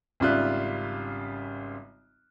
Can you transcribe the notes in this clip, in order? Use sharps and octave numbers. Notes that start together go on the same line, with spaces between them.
G#1 C#3 G3 F4 E5 F#6